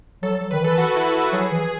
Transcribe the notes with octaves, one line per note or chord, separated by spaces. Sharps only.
F#3 A4
F#3
D#3 B4
E3 A4
F#4
E4
F#4
F#3 G#4
E3
G#4